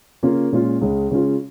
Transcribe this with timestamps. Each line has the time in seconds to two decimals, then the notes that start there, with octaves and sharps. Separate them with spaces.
0.23 C#3 A#3 C#4 F4
0.52 A#2 G#3 C#4 F4
0.81 C#2 C#3 G#3 C#4
1.11 C#3 G#3 C#4 F4